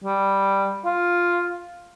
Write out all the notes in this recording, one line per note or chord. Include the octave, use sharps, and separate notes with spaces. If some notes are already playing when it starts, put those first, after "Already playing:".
G3
F4